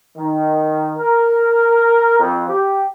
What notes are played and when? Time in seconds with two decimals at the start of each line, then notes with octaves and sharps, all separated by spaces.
0.16 D#3
0.97 A#4
2.18 F2
2.47 G4